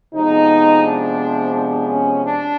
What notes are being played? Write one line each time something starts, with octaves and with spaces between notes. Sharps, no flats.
C3 F3 G#3 B3 D#4
D4
D4
C#4
D4